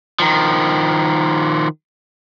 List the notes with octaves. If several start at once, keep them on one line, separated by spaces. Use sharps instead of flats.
D#3 F3